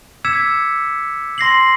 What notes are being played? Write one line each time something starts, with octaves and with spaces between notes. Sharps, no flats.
D6 E6 G#6 B6 C#7 E7
C6 A#6 C7 F#7